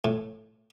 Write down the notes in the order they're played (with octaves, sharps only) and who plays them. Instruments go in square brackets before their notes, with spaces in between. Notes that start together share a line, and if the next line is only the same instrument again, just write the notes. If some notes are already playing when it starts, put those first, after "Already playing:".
[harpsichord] A2